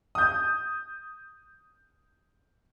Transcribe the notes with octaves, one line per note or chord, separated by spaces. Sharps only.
D#6 G6